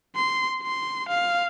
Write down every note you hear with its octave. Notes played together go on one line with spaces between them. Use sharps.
C6
C6
F5